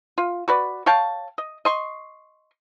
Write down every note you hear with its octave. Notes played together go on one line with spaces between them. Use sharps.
F4
F#4 B4 D5
C#5 F5 G5 A5
D#5
D#5 C6 C#6